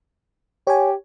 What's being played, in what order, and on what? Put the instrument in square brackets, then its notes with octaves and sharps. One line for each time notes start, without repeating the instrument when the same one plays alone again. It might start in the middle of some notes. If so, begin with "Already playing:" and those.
[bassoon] G4 [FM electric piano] C#5 G#5